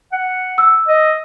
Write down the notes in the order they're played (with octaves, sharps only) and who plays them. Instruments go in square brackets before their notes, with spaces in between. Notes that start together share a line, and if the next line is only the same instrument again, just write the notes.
[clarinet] F#5
[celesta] E6
[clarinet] D#5